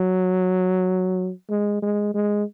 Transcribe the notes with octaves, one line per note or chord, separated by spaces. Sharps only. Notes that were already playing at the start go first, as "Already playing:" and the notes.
Already playing: F#3
G#3
G#3
G#3